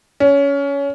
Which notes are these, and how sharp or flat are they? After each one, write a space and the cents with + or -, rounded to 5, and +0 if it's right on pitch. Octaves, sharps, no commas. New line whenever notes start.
C#4 +20